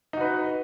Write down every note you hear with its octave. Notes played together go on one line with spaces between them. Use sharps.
D#4 F#4 B4